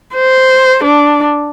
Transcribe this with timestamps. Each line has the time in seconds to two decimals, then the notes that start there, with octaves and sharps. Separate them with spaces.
0.15 C5
0.84 D4